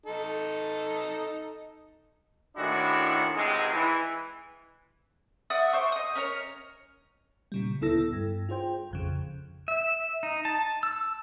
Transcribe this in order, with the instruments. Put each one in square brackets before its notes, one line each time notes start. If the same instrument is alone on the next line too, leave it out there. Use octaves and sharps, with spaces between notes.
[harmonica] D#4 A4
[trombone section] A2 D#3 G#3 D4 E4 F#4
C#2 G#2 C3 G#3
E3
[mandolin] D5 E5 F#5 D#6
C5 A5 C#6 D6
D#5 D#6
C#4 A#4 C#5
[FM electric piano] A#2 C#3 G3
D2 B3 E4 A4 E6 A#6
G2
F4 G#4 C5 G5
A1 F2 C#3
[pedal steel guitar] E5
D#4
A5
E6